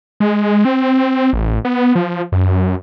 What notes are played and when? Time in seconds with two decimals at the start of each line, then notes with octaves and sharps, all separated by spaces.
0.20 G#3
0.65 C4
1.33 A1
1.65 B3
1.95 F3
2.32 F#2